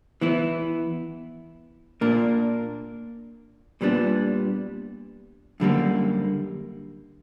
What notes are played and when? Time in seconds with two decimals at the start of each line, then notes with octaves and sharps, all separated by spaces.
0.21 E3 B3 E4
2.01 A#2 A#3 D4 A#4
3.81 A#2 G3 B3 D4
5.60 F#2 D3 G3 A#3